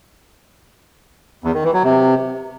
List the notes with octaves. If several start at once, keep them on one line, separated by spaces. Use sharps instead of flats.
E2
D#3
E3
F#3
C3